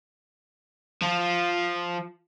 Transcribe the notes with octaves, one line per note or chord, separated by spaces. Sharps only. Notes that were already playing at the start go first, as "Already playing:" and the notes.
F3 F4